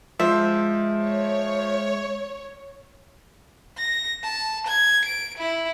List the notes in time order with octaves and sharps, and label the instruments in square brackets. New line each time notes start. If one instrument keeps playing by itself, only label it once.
[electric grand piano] F3 C5 [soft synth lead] G#3 [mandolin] E5
[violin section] C#5
[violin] A#6
A5
G#6
D7
E4